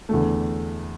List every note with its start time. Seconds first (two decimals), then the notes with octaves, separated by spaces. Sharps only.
0.09 E2 D3 A3